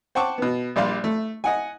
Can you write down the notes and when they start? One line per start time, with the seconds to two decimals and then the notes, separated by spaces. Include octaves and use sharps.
0.15 C5 F#5 G5 A5 C#6 D6
0.38 B2 B3
0.76 A#1 G3 D5 F5 C6
1.04 A3
1.44 D#5 F#5 G#5